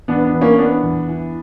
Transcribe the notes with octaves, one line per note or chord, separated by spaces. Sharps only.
E2 B3 D4
B3 D4
E3
A#3 C#4
E3 B3 D4
E2
E3